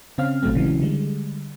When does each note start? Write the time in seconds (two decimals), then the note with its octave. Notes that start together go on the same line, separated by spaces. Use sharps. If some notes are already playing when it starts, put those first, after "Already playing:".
0.18 C#3 C4 C#4 F5 F6
0.42 A1 A#2 F#3 A3 C4
0.55 C#3 E3 F#3 G#3
0.81 D3 G3 G#3